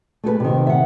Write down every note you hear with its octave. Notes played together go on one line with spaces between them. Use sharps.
A3 G#4 A4 B4
C3 D#3
E5 F#5